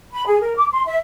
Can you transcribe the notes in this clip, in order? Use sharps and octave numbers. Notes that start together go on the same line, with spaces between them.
B5
G#4
A#4
D6
C6
E5